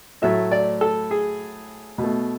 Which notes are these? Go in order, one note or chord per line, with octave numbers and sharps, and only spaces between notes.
A2 F#3 A3 E5
D5
A4
G#4
B2
A3